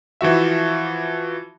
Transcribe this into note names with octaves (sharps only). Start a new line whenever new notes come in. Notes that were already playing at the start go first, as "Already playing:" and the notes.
E3 F3 F#4 E5